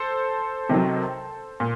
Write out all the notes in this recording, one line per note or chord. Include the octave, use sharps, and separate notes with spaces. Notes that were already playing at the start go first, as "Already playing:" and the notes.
Already playing: A4 C5
C3 D#3 F#3
A#2